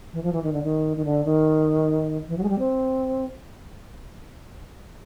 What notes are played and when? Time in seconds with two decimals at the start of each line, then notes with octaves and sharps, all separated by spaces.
0.13 E3
0.23 F3
0.33 E3
0.43 D#3
0.53 D3
0.64 D#3
0.97 D#3
1.05 D3
1.25 D#3
2.28 E3
2.38 F#3
2.43 G#3
2.49 G3
2.59 C4